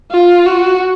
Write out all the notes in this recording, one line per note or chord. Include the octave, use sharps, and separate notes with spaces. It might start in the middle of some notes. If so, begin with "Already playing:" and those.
F4
F#4